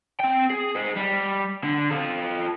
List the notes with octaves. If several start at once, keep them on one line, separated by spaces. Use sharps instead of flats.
C4 G5
G#4
G#4 C5
G3
D3
F4 A4